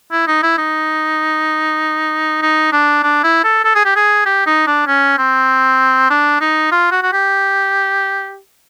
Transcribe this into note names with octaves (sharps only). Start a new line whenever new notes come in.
E4
D#4
E4
D#4
D#4
D4
D4
E4
A4
A4
G#4
G4
G#4
G4
D#4
D4
C#4
C4
D4
D#4
F4
F#4
F#4
G4